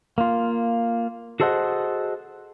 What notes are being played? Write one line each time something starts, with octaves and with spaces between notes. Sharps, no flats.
A#3 F4
F#4 G#4 A4 C5 D#5 F#5